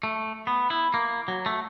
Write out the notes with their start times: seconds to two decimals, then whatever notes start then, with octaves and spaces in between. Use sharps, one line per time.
0.03 A3
0.47 B3
0.70 E4
0.94 A#3
1.28 F#3
1.46 A3